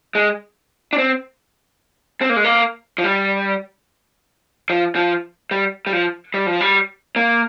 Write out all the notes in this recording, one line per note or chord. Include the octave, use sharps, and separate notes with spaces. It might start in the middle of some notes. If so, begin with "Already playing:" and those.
G#3
D4
C4
C4
A#3
G#3
A#3
F3
G3
F3
F3
G3
G3
F3
G3
F3
G3
A#3